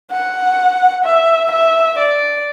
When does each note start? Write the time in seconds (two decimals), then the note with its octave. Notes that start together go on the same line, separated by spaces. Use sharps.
0.11 F#5
1.05 E5
1.52 E5
1.99 D5